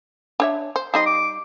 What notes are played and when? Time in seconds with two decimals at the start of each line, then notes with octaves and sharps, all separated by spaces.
0.40 D4 C#5 E5
0.76 C5
0.94 G3 D#4 D#5 C6
1.06 D6